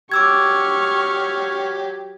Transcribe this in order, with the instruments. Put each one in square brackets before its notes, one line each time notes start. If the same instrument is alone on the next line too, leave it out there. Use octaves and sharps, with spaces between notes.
[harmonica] F#3 G4 [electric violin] C#6 F6 [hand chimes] D6 E6 G#6